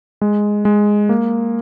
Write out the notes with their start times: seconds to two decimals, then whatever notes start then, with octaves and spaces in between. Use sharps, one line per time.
0.21 G#3
0.65 G#3
1.09 A#3